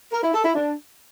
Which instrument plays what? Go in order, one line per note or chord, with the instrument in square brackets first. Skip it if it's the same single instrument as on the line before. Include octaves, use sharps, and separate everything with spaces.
[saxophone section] A#4
E4
A4
E4
D4